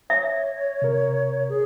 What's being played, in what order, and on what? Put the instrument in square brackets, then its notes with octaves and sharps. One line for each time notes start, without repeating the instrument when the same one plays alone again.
[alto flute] C#5 [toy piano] E5
[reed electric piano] C3 A#4
[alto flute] G#4